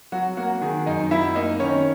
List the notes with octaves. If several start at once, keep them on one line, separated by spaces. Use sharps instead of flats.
F#3 F#4
A#3 F#4
D#3 G#4
F#2 D#4 D#5
F#3 E4 E5
A#3 D#4 D#5
D#3 C#4 C#5